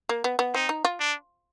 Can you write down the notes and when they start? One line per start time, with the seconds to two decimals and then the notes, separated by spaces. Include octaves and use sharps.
0.09 A#3
0.24 B3
0.39 B3
0.55 C4 D#4
0.69 D#4
0.85 F4
1.00 D4